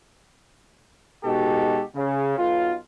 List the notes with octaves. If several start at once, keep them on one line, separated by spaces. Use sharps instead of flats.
B2 G#3 D#4 F#4 G4 A4
C#3
B1 F4